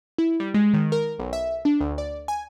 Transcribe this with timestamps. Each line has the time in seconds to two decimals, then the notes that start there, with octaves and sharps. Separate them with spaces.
0.18 E4
0.40 G3
0.54 G#3
0.74 D#3
0.92 A#4
1.19 B1
1.33 E5
1.65 D4
1.80 D2
1.98 D5
2.28 G#5